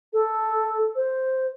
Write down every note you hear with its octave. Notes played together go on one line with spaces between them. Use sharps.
A4
C5